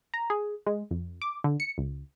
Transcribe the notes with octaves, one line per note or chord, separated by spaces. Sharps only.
A#5
G#4
G#3
F2
D6
D3
C#7
C#2